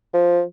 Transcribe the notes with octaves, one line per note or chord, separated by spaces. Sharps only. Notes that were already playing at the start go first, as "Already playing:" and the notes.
F3